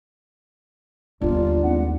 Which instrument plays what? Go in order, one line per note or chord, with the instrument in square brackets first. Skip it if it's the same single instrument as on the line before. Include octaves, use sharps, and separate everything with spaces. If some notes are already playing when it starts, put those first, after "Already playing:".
[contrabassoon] G1 [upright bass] D#2 A3 [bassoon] D4 [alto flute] F4
[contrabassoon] G#1 [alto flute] F#5